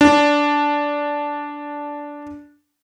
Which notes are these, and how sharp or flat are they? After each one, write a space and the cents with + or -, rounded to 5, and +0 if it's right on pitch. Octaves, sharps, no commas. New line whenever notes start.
D4 -10